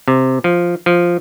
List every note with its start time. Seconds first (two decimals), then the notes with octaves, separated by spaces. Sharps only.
0.08 C3
0.44 F3
0.86 F3